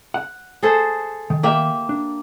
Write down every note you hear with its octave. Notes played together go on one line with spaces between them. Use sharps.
F#5
G#4 A4 C5
D#3
A#3 G4 E5
D4